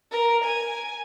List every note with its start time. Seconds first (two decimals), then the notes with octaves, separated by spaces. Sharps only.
0.12 A#4
0.44 G#5